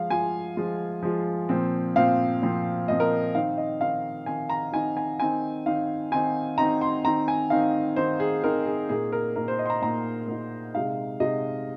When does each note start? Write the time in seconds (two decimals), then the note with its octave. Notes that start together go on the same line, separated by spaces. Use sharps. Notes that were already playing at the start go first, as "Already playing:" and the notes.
Already playing: F3 G#3 F4 F5
0.10 F3 G#3 F4 G#5
0.57 F3 G#3 F4
1.03 F3 G#3 F4
1.49 A#2 F3 C4
1.96 A#2 F3 C4 F5
2.43 A#2 F3 C4
2.88 A#2 F3 C4 D#5
3.00 A#4
3.35 D#3 C4 D#4 F5
3.58 D#5
3.80 D#3 C4 D#4 F5
4.26 D#3 C4 D#4 G#5
4.49 A#5
4.73 D#3 C4 D#4 G#5
4.97 G#5
5.20 D#3 C4 D#4 G#5
5.66 D#3 C4 D#4 F5
6.12 D#3 C4 D#4 G#5
6.58 D#3 C4 D#4 A#5
6.81 C6
7.04 D#3 C4 D#4 A#5
7.28 G#5
7.50 D#3 C4 D#4 F5
7.96 D#3 C4 D#4 C5
8.20 G#4
8.43 D#3 C4 D#4 A#4
8.67 G#4
8.89 A#2 A#3 D#4 G#4
9.12 A#4
9.36 A#2 A#3 D#4 A#4
9.48 C5
9.59 D#5
9.66 C6
9.70 A#5
9.82 A#2 A#3 D#4 A#5
10.28 A#2 A#3 D#4
10.74 C3 G#3 D#4 F5
11.20 C3 G#3 D#4 D#5